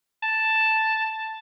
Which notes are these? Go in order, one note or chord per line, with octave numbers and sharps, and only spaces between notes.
A5